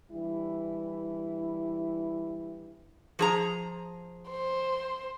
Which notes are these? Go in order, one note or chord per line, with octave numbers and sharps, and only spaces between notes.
E3 G3 D4 E4
F3 G#4 A#5
C5